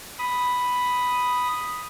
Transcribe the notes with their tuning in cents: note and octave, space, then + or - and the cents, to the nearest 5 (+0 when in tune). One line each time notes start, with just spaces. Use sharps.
B5 +0 D#6 +0